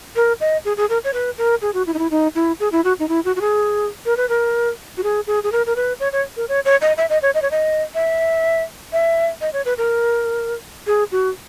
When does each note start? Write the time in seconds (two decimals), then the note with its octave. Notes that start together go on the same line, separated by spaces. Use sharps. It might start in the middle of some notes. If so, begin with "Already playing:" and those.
0.16 A#4
0.40 D#5
0.65 G#4
0.77 G#4
0.90 A#4
1.04 C#5
1.13 B4
1.38 A#4
1.62 G#4
1.74 F#4
1.87 E4
1.94 D#4
1.99 E4
2.11 D#4
2.35 E4
2.60 G#4
2.72 E4
2.84 F#4
3.00 D#4
3.09 E4
3.25 F#4
3.36 F#4
3.41 G#4
4.06 A#4
4.17 B4
4.29 A#4
4.97 F#4
5.03 G#4
5.27 G#4
5.43 G#4
5.52 A#4
5.66 A#4
5.76 B4
6.00 C#5
6.13 C#5
6.37 A#4
6.49 C#5
6.65 C#5
6.81 D#5
6.97 E5
7.10 D#5
7.22 C#5
7.34 D#5
7.42 C#5
7.51 D#5
7.95 E5
8.93 E5
9.41 D#5
9.53 C#5
9.65 B4
9.78 A#4
10.87 G#4
11.12 F#4